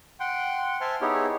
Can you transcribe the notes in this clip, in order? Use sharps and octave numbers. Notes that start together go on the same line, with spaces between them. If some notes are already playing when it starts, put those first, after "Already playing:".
F#5 G5 C6
C5 E5 G#5 A5 C6 F6
B3 D#4 E4 G4 G#4 C#5